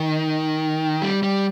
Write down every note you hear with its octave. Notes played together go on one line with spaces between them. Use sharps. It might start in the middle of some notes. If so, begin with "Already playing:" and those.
Already playing: D#3
G3
G3